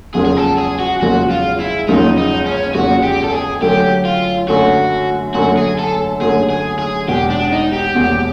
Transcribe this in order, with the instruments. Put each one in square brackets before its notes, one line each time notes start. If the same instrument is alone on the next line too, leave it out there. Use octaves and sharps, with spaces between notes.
[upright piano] F#1 E2 C#3 F3 G#3 [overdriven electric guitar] G#4
[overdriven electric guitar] G#4
A4
G#4
F#4
[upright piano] F#1 E2 C#3 F3 G#3 [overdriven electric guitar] F#4
[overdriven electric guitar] F4
E4
[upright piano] F#1 E2 C#3 F3 G#3 [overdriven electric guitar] D#4
[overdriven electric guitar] D#4
C#4
[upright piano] F#1 E2 C#3 F3 G#3 [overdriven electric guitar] F#4
[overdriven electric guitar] G4
A4
G#4
[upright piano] F#2 D3 F#3 A3 [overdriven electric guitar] G4
[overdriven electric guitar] F4
[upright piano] F#2 D3 F#3 A3 [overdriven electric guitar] F#4
[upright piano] F#2 D3 F#3 A3 [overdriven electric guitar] F#4
[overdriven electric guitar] G#4
A4
[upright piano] F#2 D3 F#3 A3 [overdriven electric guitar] G#4
[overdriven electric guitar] G#4
G#4
[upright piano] E1 E2 B2 [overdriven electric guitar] G4
[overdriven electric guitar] D4
D#4
G4
[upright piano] E1 E2 B2